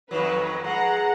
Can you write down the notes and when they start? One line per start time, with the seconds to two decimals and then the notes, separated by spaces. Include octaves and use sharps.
0.11 F2 D#3 F#3 B4
0.64 G#3 F#5 A#5